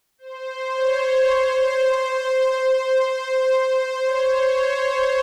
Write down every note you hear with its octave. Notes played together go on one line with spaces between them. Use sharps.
C5
C#5
C5
C5
C5
C#5